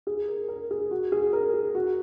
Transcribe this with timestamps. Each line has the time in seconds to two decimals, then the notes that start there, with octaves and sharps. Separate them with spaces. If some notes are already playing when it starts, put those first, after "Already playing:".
0.07 G#4
0.28 A#4
0.48 A#4
0.71 G#4
0.91 F#4
1.12 G#4
1.33 A#4
1.54 G#4
1.75 F#4